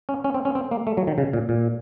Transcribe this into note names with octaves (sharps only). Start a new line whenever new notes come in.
C#4
C#4
C4
C#4
C4
A#3
A3
F#3
D#3
C#3
A#2
A#2